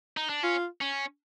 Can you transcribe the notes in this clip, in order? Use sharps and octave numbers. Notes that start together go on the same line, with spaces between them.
D#4
D4
C#4 F4
C#4